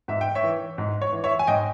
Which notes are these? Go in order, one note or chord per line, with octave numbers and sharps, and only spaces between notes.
G#2 E5
G5
C#5 E5
E3
G#2
C#5
E3
C#5 E5
G#5
G#2 D#5 G5